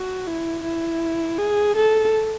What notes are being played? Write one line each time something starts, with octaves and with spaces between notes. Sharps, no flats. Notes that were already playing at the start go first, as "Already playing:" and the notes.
Already playing: F#4
E4
E4
G#4
A4